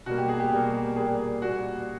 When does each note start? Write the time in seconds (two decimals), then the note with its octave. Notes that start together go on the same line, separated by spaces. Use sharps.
0.06 B2 G3 A#3 F#4
0.18 G4
0.29 G#4
0.40 G4
0.51 B2 G3 A#3 G4
0.96 A#2 G3 A#3 G#4
1.42 A#2 G3 A#3 F#4